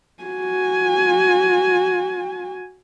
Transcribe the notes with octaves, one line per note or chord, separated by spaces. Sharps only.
F#4 G#5